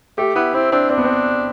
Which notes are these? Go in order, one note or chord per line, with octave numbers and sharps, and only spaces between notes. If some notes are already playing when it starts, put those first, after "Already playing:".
A3 G4
B3 E4
C4 E4
C4 D4
C4 D4
B3
C4